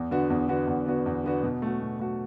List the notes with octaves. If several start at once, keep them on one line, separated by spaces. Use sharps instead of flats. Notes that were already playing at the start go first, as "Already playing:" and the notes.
Already playing: E2
D3 B3 F#4
E2
D3 B3 F#4
E2
D3 B3 F#4
E2
D3 B3 F#4
B2
A3 F#4
B2
A3 F#4